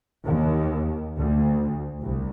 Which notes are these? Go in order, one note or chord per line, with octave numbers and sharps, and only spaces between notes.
D#2
D2
C2